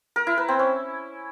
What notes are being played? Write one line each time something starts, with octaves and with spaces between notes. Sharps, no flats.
A#4
E4
B4
C4
C#4